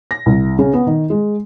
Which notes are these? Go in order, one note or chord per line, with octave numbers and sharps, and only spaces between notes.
A#6
C2
C#3
B3
D#3
G#3